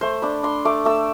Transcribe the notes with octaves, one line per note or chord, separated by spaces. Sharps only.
A3 C5
D4 B5
D4 C6
A3 D6
A3 E6